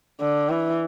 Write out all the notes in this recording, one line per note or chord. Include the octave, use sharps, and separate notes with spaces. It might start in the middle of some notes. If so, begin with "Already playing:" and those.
D3
E3